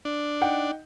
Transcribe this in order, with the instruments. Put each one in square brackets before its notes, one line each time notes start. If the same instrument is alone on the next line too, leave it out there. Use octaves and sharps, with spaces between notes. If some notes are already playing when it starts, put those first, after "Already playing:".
[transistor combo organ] D4
[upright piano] D#4 F#5 G5